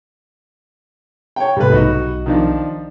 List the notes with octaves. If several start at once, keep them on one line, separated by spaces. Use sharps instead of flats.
C#5 G5
G#2 C3 G3 A3 B4
B1 D#4 F#4
D#3 F3 D4